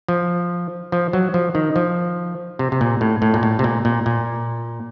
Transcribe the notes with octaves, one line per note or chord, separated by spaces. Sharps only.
F3
F3
F#3
F3
D#3
F3
C3
C3
A#2
A2
A2
A#2
A2
C3
A#2
A#2
A#2